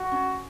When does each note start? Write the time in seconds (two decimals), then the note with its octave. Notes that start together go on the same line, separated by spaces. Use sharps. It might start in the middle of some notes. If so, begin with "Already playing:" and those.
Already playing: F#4
0.12 C#4